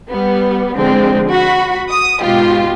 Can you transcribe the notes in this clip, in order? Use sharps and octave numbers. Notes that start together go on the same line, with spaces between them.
G3 B3
D3 F3 G#3 C4
F#4 B5
D#6
G#2 B2 F4 G4